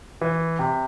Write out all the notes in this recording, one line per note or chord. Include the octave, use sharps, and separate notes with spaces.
E3
C3